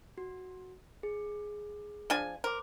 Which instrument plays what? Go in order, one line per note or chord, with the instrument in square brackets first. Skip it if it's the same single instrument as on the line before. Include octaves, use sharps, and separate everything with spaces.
[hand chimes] F#4
G#4
[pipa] F3 D4 G#5
[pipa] A#4 [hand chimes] C5 D6